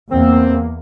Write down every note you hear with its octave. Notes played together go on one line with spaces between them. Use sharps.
E2 A#3 C4